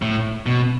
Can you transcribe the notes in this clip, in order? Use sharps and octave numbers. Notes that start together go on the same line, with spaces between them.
A2
B2